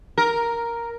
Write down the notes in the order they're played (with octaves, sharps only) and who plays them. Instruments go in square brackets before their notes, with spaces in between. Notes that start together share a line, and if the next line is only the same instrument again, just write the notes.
[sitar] A#4